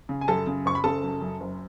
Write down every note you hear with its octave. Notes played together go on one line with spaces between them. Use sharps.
C#3
G#5
F#2 A4 A5
C#3
F#1 C#6
B5
C#3 A4 A5
F#2
F#2
F#1